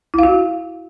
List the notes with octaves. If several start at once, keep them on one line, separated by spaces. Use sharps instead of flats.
E4 F#4 F5